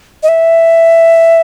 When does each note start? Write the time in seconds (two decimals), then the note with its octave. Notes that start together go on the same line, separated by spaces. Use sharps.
0.23 D#5
0.28 E5